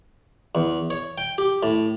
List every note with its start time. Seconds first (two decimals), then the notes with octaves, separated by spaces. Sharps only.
0.55 E2
0.90 C#5
1.18 G5
1.38 G4
1.63 A2